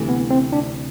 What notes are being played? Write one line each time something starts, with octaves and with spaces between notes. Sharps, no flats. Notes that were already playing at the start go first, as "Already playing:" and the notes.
Already playing: D2 C3 E3 A3
B3
C4
D4